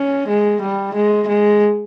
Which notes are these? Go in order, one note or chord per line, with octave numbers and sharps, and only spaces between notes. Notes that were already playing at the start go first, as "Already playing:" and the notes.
Already playing: C#4
G#3
G3
G#3
G#3